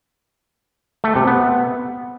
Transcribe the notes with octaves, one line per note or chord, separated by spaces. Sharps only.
A3
C3
B3